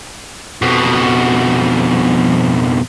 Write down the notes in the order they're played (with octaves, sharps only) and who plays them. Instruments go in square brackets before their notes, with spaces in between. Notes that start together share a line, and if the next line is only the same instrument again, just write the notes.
[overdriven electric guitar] F2 B2